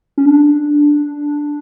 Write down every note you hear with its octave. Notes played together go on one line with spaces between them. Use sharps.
C#4
D4